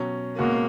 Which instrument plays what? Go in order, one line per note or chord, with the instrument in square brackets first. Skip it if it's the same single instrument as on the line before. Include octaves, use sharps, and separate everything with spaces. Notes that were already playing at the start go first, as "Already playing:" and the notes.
Already playing: [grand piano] B2 F#3 C#4
[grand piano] B2 G#3 C#4 F#4 [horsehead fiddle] A#3